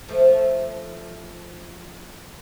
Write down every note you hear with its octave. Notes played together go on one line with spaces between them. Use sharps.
F3 A3